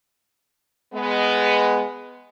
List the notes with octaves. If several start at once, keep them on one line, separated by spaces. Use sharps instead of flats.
G#3 B3